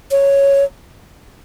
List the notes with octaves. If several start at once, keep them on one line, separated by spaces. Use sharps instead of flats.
C#5